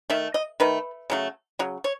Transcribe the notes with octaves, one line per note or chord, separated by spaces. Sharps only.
D#3 A3 E5
D#5
D#3 A3 B4
C#3 F#3 A3
C#3 F#3
C#5